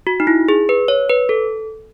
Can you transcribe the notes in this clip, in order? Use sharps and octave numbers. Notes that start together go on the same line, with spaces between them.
F#4
D#4
E4
G#4
B4
C#5
B4
A4